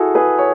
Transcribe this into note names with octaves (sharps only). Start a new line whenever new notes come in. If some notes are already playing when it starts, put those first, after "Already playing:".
Already playing: E4 F#4 G#4 A4
G#4 B4
C#5